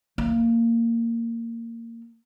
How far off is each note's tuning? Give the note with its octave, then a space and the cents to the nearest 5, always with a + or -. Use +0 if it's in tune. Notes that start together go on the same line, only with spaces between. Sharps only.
A#3 -15